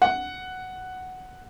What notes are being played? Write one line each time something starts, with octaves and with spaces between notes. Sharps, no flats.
F#5